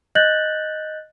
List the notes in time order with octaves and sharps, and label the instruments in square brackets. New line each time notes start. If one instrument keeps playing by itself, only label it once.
[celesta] D#5 F#6 G6 A6 A#6 F#7